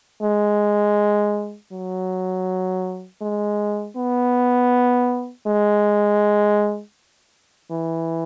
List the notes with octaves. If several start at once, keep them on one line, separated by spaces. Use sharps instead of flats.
G#3
F#3
G#3
B3
G#3
E3